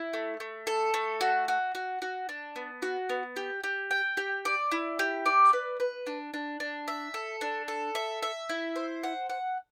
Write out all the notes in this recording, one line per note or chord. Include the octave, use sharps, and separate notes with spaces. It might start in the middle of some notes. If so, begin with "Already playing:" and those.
Already playing: E4
A3
A3
A4
A3
F#4
F#4
F#4
F#4
D4
B3
F#4
B3
G4
G4
G5
G4
D5
E4
G4
D5
B4
B4
D4
D4
D4
E5
A4
D4
A4
E5
E5
E4
C5
F#5
F#5